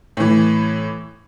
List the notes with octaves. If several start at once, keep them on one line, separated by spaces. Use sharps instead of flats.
A2 E3